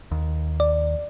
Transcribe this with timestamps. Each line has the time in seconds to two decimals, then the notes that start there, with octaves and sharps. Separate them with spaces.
0.11 D#2
0.60 D5